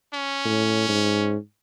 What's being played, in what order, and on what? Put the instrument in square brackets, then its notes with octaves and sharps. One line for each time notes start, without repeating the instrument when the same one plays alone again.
[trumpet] C#4
[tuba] A2
G#2